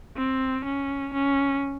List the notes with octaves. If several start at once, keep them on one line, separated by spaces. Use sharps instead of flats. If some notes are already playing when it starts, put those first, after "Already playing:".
C4
C#4
C#4